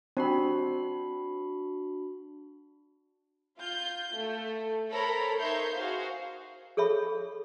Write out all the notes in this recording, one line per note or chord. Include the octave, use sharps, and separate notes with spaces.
C4 D4 F#4 B5
F4 G6
A3
A4 A#4 C5 C#5 A#5 B5
D#4 A#4 C#5 E5 C6 G6
F#4 G#4 C5 F5
G#4 A4 C#5 E5 B5